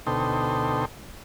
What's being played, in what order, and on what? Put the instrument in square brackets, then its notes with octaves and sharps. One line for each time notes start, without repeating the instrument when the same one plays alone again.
[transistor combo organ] D2 B2 D#4 A4 C5 G5